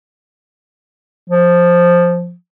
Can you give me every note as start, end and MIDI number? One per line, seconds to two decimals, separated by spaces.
1.29 2.34 53